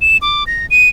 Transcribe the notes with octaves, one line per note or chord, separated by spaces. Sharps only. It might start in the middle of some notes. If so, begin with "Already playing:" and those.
E7
D6
A#6
D#7